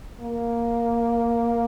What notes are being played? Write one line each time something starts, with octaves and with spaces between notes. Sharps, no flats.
A#3